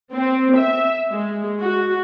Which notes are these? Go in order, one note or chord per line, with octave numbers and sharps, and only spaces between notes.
C4
E5
G#3
F#4